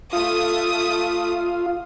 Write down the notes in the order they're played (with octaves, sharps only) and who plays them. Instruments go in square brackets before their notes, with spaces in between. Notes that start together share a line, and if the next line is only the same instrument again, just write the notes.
[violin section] A3 D#6 [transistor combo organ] F4